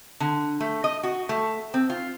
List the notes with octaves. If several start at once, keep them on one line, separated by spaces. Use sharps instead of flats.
D3
A3
D#5
F#4
A3
C4
F4